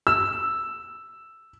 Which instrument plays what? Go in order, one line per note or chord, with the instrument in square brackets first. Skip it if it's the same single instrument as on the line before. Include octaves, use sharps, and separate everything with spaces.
[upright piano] E6